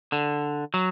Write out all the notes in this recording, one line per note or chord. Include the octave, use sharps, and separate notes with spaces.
D3
F#3